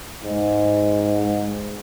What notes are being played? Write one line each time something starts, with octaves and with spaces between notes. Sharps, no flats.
G#2